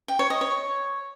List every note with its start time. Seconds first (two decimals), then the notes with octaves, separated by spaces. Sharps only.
0.08 G5
0.19 C#5
0.30 D#5
0.41 C#5